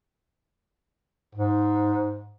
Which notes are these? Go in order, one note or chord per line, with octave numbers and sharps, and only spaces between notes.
G#2